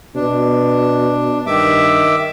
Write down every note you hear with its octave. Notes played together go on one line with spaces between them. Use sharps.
B2 D4
G2 D#3 E5 D6